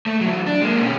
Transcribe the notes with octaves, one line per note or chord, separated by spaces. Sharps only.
A3
E3 F#3
D4
G#3 A#3
B2 C#4